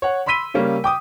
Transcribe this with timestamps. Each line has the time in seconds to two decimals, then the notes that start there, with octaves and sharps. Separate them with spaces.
0.02 C#5 F#5
0.26 B5 C6 E6 B6 D#7 G7
0.54 C#3 G3 A#3 C#4
0.84 G5 D6 D#6